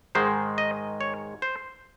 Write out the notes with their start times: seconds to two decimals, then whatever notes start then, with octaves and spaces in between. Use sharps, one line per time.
0.15 G#2 D#3 G#3 C5
0.58 D#5
1.01 C#5
1.42 C5